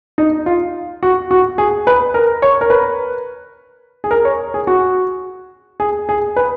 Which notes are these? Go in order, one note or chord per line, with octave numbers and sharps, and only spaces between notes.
D#4
F4
F#4
F#4
G#4
B4
A#4
C#5
A#4
B4
G#4
A#4
C#5
G#4
F#4
G#4
G#4
B4